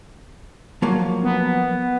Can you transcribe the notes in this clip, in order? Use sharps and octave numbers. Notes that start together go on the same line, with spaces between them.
F3 F#3 A#3
B3